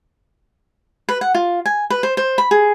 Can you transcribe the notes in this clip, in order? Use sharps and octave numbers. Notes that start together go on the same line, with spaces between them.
B4
F#5
F4
G#5
B4
C5
C5
B5
G#4